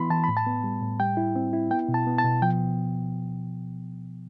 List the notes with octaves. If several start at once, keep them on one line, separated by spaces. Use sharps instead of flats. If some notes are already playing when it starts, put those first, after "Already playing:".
Already playing: E3 B3 E4 B5 C6
E3 A5
A2 B5
A5
B3
G3
A2
G3 G5
E4
C4
E4
B3 G5
B2
A5
B3
A5
B2
F3 G5